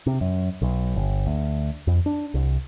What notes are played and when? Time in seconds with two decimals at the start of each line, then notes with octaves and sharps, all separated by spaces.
0.06 C3
0.21 F#2
0.62 B1
0.96 G1
1.27 D2
1.87 F2
2.06 D4
2.34 C2